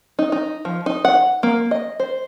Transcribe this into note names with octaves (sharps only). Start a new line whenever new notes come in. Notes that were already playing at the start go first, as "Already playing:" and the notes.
D#4
D#4
F3
D#4
F#5
A#3
D#5
C5